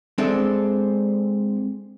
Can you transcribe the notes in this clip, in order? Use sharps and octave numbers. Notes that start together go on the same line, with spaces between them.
G#3 C4 D4 A4 E5